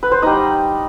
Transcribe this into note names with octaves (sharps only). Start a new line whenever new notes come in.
B4
C5
G3 D#4 D#5